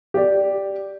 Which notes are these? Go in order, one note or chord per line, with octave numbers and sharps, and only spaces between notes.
G4 D5